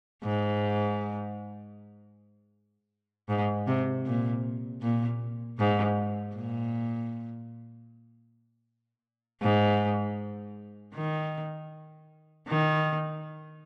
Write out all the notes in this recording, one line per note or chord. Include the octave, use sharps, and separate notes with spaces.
G#2
G#2
C3
A#2
A#2
G#2
A#2
G#2
D#3
D#3